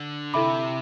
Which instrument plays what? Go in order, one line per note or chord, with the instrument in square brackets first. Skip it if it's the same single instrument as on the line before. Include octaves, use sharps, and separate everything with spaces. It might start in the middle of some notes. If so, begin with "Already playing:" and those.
Already playing: [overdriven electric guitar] D3
[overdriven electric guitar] C3 [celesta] E4 A4 E5 B5 D6